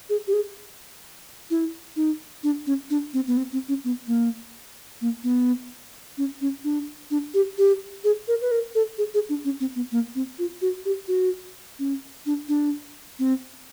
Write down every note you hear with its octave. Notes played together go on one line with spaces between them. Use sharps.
G#4
G4
G#4
E4
D#4
D4
C#4
D4
C4
B3
C4
C4
C#4
B3
A#3
A#3
B3
C#4
C#4
D4
D4
G4
G4
G#4
A#4
B4
A#4
A4
G#4
G#4
D4
C#4
C4
B3
A#3
C4
F4
F#4
G4
F#4
C#4
D4
D4
C4